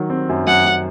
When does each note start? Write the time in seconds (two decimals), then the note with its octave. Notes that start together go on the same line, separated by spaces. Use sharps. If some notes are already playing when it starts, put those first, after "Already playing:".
Already playing: D#3 F#3
0.10 C4
0.29 F#2
0.47 F#2 F#5
0.65 F#2